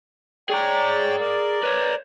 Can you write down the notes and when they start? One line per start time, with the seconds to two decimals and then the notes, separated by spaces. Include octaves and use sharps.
0.50 G#4 C#5 D5 G5 A#5
1.19 A#4 D5
1.63 B4 C#5